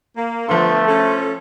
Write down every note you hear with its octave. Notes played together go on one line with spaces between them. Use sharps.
A#3
D3 F3 A3 B3 A4 C6
C#4 A4